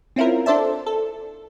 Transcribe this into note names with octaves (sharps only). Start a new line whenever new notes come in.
C4 C#4 E4 F4 A#4
D4 A4 C5 D5 E5 A5
A4